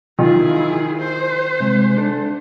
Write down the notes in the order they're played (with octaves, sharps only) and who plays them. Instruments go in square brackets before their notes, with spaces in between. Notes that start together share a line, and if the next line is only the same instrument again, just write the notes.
[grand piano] D#3 F4 [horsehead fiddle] E4 G#4
[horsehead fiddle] C5
[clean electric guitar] C3 G#3
D4 A4